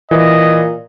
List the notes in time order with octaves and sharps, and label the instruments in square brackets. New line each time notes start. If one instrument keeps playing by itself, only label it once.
[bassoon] A#2 [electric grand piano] E3 [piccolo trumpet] D#5